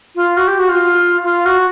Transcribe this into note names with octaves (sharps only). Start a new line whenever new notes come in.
F4
F#4
G4
F#4
F4
F4
F#4